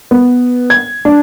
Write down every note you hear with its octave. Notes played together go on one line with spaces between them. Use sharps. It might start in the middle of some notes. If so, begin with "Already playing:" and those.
B3
G#6
D4